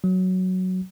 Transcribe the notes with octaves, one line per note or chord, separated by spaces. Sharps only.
F#3